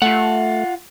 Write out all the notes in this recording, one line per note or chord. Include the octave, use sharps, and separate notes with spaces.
A3 F4 F#5